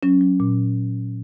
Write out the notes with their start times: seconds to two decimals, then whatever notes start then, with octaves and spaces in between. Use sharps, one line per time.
0.03 F#3 C#4
0.21 F#3
0.40 A#2